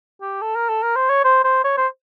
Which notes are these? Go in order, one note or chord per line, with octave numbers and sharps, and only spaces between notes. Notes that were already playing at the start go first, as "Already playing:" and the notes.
G4
A4
A#4
A4
A#4
C5
C#5
C5
C5
C#5
C5